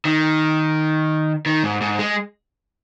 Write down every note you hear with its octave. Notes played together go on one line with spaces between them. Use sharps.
D#3
D#3
G#2
G#2
G#3